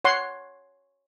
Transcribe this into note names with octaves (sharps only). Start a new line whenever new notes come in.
C#5 F#5 C6